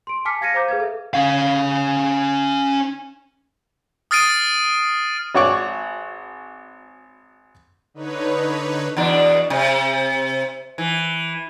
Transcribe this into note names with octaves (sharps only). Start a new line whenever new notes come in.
C6 D7
G#5 A5 D6 F6 B6 C#7
F5 G#6 A#6 C#7 D#7
C5 F5 A#5 D6 G6
G#4 B4 F5 G#6
A4 E5
C#4 F5
D#6 F6 A6 C7 D7 D#7
G#1 F#4 C#5 D5 C#6
D3 D#4 B4 C#5
E2 B2 D4
C3
E3